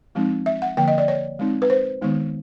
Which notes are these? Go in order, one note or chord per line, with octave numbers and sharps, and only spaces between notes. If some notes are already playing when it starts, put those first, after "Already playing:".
F3 G#3 C4 D#4
E5
F#5
D3 F3 A#3 G5
D#5
D5
C#5
G#3 C4 D#4
B4
C5
D#3 G#3 B3 D#4